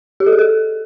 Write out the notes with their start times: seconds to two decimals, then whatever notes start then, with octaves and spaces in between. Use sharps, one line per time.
0.20 G4
0.26 A4
0.32 G#4
0.39 A4